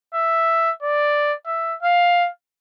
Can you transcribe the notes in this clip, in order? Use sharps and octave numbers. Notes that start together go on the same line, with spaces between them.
E5
D5
E5
F5